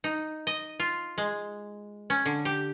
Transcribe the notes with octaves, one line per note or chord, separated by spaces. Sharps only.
D#4
D#5
F4
G#3
C#4
D3
G4